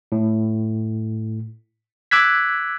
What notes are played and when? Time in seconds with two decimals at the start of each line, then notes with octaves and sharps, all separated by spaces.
0.12 A2
2.11 D6 E6 F#6 G#6 B6